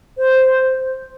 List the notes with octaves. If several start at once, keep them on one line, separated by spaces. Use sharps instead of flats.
C5